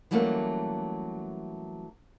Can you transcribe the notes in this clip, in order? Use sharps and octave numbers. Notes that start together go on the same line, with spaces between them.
E3 F#3 G3 A3 A#3 C#4